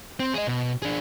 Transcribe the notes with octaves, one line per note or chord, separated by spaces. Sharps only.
C4
G#4 D#5
B2
D4 G#4